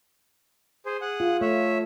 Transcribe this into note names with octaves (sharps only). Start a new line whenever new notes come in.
G#4 C5
G#4 F#5
F4
A3 C#5 E5